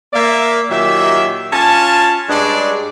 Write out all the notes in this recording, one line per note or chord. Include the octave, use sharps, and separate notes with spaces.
A#3 D5 E5
A#2 D#3 F#3 G4 E5
C#4 F4 G#5 A5
G2 G#3 D4 G#4 C#5 D5